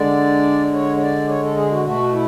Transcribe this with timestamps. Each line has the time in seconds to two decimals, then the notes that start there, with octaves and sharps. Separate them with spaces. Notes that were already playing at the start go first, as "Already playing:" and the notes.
Already playing: D3 G#3 D5
0.73 C#5
0.97 C#5
1.01 D5
1.29 C#5
1.43 A4
1.56 G#4
1.71 F#4
1.84 B2 A3 F#4
2.12 E4